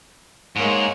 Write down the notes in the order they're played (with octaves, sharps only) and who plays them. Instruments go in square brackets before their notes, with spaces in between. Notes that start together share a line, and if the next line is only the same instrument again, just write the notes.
[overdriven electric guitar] G#2 [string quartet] G#3 A#3 C#5